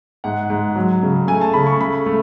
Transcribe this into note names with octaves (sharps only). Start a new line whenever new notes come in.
G#2 F#5
G#2
F#3
C#3
A3 G#5
A5
C#3 B5
C#6
A3 B5
A3